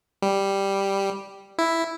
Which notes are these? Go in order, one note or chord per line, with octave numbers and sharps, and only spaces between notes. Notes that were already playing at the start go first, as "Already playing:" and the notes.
G3
E4